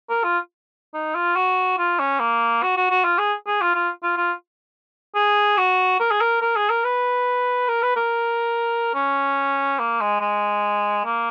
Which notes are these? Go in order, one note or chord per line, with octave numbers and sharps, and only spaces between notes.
A#4
F4
D#4
F4
F#4
F4
C#4
A#3
F#4
F#4
F#4
F4
G#4
G#4
F4
F4
F4
F4
G#4
F#4
A#4
G#4
A#4
A#4
G#4
A#4
B4
A#4
B4
A#4
C#4
A#3
G#3
G#3
A#3